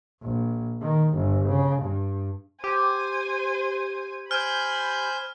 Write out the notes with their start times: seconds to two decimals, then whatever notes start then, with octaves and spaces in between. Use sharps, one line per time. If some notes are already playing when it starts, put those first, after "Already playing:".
0.22 A#1
0.82 D#3
1.15 G1
1.49 C#3
1.82 G2
2.64 G4 C5 G#5
4.31 C5 G#5 B5 F6 G6